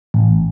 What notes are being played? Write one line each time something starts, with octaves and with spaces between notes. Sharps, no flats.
A1